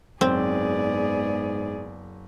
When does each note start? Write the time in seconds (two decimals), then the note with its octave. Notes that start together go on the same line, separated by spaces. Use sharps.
0.21 F#1 G#2 B3 C4 G#4 D5